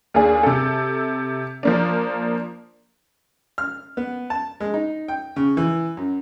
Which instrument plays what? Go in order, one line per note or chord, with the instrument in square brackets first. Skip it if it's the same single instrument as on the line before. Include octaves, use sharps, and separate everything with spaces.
[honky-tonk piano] D#2 D4 G#4
C3 A4
F3 A#3 D4
[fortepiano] F6
B3
A5
G#3
D#4
G5
C#3
E3
F#2